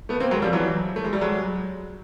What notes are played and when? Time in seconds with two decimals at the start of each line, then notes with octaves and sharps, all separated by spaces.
0.09 A3 B3
0.20 A#3 C4
0.31 F#3 G#3
0.42 F3 G3
0.53 E3 F#3
0.96 A3
1.04 G#3
1.13 G3
1.21 F#3 G#3